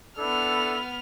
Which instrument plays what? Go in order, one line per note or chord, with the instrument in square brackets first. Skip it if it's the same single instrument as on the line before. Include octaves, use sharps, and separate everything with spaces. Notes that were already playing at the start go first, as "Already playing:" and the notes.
[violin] B3 F6 [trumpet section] D4 E4 A4